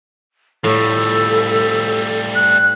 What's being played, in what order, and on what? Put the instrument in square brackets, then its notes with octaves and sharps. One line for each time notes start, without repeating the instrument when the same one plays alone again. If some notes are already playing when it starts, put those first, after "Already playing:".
[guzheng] A2 [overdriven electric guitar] F3 G3 [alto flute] A4
[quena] F#6